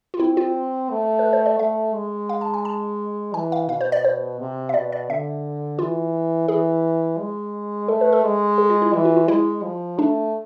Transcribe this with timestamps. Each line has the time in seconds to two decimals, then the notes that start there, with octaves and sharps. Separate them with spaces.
0.14 F4
0.20 C4 E4
0.37 F4
0.90 A3
1.19 B4
1.33 C5
1.46 D5
1.59 A3 E5
1.94 G#3
2.29 F5
2.41 A5
2.54 G#5
2.65 A5
3.34 E3 G#5
3.52 F5
3.69 B2 F5
3.81 C5
3.92 D5
4.05 C5
4.40 C3
4.69 E5
4.74 B2 D5
4.92 D5
5.10 D3 E5
5.79 E3 F4
6.48 E3 G#4
7.19 G#3
7.88 A3 A4
8.01 B4
8.12 A4
8.24 G#3
8.58 G#4
8.70 F4
8.82 E4
8.94 E3 E4
9.05 F4
9.17 F4
9.28 G#3 E4
9.63 F3
9.99 A3 D4